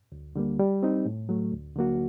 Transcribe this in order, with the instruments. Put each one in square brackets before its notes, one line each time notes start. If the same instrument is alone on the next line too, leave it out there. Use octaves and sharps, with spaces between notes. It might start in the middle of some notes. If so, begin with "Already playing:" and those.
[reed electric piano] D2
D3 G3 A#3
G3
C4 D#4
A2
F#3 A3
D2
D3 F#3 A#3 F#4